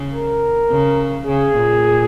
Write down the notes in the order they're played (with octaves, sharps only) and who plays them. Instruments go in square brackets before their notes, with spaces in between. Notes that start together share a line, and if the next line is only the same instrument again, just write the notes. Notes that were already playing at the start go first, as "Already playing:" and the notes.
Already playing: [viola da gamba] C#3
[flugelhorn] A#4
[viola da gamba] C#3
[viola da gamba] C#3 [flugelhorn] G#4
[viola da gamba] A#2